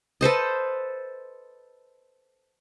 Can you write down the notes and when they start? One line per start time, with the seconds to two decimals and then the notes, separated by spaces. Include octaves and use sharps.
0.21 A4 B4 C5 D#5